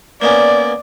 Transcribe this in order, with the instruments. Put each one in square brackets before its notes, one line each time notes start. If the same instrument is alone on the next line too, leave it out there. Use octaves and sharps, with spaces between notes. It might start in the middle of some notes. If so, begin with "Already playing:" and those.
[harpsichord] A#3 B3 C#4 [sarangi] D5